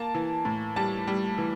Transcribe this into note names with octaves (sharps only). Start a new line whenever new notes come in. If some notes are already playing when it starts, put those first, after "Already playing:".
Already playing: A#3 A5
E3
A2
G3 A5
G3
E3